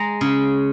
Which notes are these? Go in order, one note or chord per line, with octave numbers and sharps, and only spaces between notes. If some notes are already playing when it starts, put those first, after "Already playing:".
Already playing: G#3 A#5
C#3